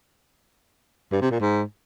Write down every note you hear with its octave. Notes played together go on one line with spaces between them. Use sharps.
G2
C3
A#2
G#2